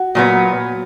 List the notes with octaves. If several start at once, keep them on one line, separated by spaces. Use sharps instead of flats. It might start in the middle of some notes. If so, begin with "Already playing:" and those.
Already playing: F#4
A#2 F#3 B3